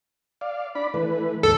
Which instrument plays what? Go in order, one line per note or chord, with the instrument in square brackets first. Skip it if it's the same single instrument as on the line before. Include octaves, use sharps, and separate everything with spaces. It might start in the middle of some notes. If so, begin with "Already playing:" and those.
[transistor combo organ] D5 F5
D4 D5 B5
E3 A3 B4
[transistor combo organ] D#2 G#2 D3 [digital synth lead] A4